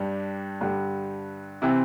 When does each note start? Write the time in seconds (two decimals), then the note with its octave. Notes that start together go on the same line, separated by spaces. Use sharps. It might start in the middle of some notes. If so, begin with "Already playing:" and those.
Already playing: G2 G3 D4
0.61 G2 D3 G3
1.62 C3 E3 C4